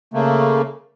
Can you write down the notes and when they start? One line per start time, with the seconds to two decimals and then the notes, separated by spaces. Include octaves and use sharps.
0.14 C#3 A3 A#3